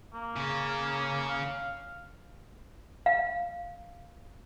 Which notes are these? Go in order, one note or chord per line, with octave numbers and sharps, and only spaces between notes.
A#3
C#3 C#4
F5
F5